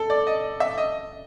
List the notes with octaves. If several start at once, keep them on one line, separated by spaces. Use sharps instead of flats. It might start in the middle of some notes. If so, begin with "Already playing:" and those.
Already playing: A4
D5
D#5
E5
D#5